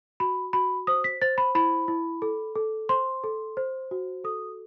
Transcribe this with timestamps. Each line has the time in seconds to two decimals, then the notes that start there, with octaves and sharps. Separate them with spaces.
0.20 F#4 B5
0.53 F#4 B5
0.87 C5 D#6
1.04 B6
1.22 C5 A6
1.38 B5
1.55 E4 B5
1.88 E4
2.22 A4
2.55 A4
2.89 C5 C6
3.24 A4
3.57 C5
3.91 F#4
4.24 A4 D#6